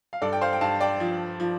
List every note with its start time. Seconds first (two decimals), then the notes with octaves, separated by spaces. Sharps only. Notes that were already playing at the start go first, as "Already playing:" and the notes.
0.13 F5
0.21 G2 A4 D5
0.33 G5
0.41 C5 F5
0.53 G5
0.61 G2 F5 A5
0.80 D5 G5
1.00 F3
1.40 F3